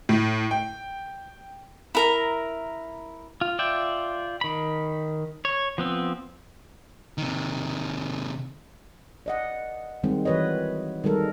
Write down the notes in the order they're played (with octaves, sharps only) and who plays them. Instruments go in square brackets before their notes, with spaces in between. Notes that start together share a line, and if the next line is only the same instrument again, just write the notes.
[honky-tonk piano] A2
G5
[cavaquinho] E4 A#4 A#5
[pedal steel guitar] F4
F4 D5 E5 G5
D#3 B5
C#5
F3 B3 C4
[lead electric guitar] C3 D#3
[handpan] D5 D#5 F#5
D#3 G3 G#3 C4
E3 F#4 B4 C#5 D#5
D#3 G3 G#3 A4 A#4